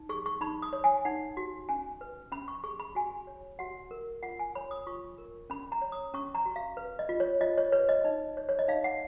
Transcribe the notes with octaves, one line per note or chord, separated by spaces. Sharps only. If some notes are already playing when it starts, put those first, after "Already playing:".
Already playing: D#4
G#4 C#6
C#6
D#4 B5
D#6
C#5
G#5
D#4 F#5
F#4
C#4 G#5
B4
C#4 B5
C#6
G#4 C#6
B5
F#4 G#5
C#5
F#4 F#5
A#4
F4 F#5
G#5
C#5 B5
D#6
F4 C#6
A#4
C#4 B5
A#5
C#5
D#6
C#4 C#6
A#5
F#4
F5
B4
D#5
F4
C#5
F4 D#5
C#5
B4 C#5
D#5
D#4
C#5
C#5
D#5
D#4 F5
F#5